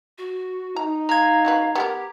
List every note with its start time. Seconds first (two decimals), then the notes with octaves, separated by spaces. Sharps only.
0.18 F#4
0.76 D#4 A#5
1.09 G#3 F5 A#5 G#6
1.45 C#3 F#4 B4
1.75 B3 G4 G#4 A#4